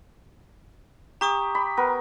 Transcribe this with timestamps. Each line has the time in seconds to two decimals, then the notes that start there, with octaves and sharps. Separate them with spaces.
1.21 G4 A#5 C#6 D#6
1.55 B5
1.77 B3 A#4